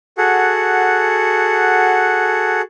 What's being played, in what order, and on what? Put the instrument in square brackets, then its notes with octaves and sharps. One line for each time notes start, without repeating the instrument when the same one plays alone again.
[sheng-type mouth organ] F#4 G#4 A4 F#5